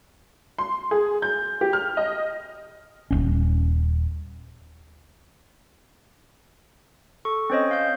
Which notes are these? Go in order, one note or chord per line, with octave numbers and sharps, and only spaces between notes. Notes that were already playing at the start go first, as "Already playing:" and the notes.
C6
G#4
G6
G4
F6
D#5
D#1 G#1 C#4
A4 C#6
C4 C#4 C5 C#5 D#5
F5 G6